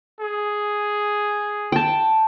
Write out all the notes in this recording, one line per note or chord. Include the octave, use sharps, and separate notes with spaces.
G#4
G5 A5